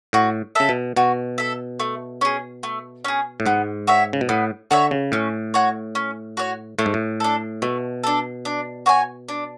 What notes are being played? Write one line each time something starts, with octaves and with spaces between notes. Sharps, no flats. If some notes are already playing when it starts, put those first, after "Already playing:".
A2 F#4
C#3 A4 E5
B2
B2 F#4
A4 E5
A3
C#4 G#4
A3
C#4 G#4
A2
G#2 B3
F#4 C#5 E5
C#3
B2
A2 B3
D3 F#4 C#5 E5
C#3
A2 C#4
F#4 C#5
C#4
F#4 C#5
A2 A3
G#2
A2
D4 A4
B2 A3
D4 A4
D4
F#4 C#5 G#5
D4